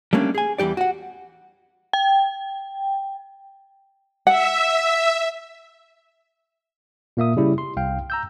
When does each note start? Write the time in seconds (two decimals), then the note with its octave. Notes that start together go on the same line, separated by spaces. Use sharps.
0.13 G3 A3 A#3 C#4 D4
0.35 G#4 G#5
0.58 E2 E3 G3 G4 D5
0.77 F#4 F#5
1.93 G5
4.27 E5 F#5
7.17 A#2 A#3 E5 D#6
7.37 C#3 G3 E4
7.58 C6
7.77 C2 F5 G5
8.10 A#5 E6 G6